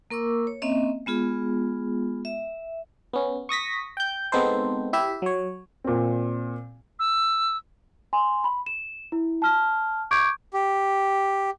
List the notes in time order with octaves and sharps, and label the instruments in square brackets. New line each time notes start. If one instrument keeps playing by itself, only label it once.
[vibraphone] A#3 A#4 C#6 D6 E6
C#5
A#3 C4 C#4 D#5 E5
G#3 B3 F4 G#4
E5
[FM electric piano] B3 C#4
C#6 D#6 A#6 B6
G5 G6
G#3 B3 C4 D#4 A4 C5
E4 G4 E5
F#3 C#5
[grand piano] A#2 C4
[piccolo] E6
[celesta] G#5 C6
B5
E7
E4
A5 F6
C#6 D6 G6 G#6 D7
[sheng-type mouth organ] G4